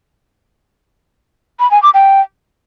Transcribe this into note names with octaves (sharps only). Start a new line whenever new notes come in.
B5
G#5
D6
G5